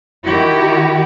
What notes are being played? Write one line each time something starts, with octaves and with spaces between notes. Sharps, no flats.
D#3 E4 F#4 G4